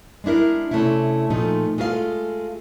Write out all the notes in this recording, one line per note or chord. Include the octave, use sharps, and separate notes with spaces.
G#3 B3 D4 E4 A#4
C3 A3 C#4 D4 E4
A#2 F3 A3 D#4
G#3 A3 F4 A#4 F5